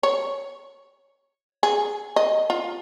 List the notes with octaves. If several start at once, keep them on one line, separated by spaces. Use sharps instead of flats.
C#5
G#4
D#5
F4